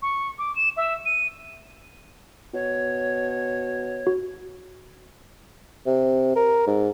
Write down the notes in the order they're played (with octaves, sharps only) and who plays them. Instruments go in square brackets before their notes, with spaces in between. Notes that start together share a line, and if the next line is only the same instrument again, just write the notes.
[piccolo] C#6
D6
E7
E5
D#7
[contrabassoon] B2 [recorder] C#5
[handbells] F#4
[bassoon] C3
A#4
G#2